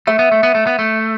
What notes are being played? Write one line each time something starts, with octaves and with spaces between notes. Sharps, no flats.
A3 E5
B3
A3
B3
A3
B3
A3